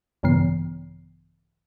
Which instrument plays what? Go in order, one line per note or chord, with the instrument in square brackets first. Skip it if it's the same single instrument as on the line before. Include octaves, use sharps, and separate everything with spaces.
[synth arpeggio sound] A#1 G2 C#3 E3 B3 C7